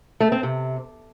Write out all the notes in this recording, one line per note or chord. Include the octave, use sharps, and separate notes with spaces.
A3
C4
C3